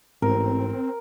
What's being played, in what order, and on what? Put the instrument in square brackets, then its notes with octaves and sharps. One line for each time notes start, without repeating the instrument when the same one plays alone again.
[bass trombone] A1 [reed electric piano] G#2 [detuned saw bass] C4 [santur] A#4